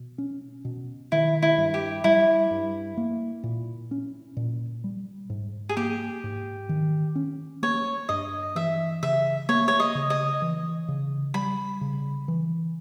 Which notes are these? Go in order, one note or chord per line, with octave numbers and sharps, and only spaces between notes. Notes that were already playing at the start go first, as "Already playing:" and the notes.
Already playing: B2
C#4
B2
D#3 E4
E4
G2
G4
G3 E4
G2
A#3
A#2
C#4
A#2
G3
G#2
G#4
A#3 G4
G#2
D#3
C#4
A#3 C#5
G2 D#5
E3 E5
C#3 E5
A#3 C#5
C#5
D#5
C#3
D#5
E3
C#3
G3 B5
C#3
E3